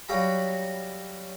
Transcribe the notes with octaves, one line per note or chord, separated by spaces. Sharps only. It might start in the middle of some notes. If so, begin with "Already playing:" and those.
F#3 G3 F#4 F5 A#5 B5